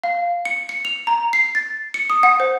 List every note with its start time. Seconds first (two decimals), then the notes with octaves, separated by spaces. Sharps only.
0.04 F5
0.45 C#7
0.69 C#7
0.85 F7
1.07 A#5
1.33 C7
1.55 A6
1.94 C#7
2.10 D#6
2.23 F#5
2.40 C5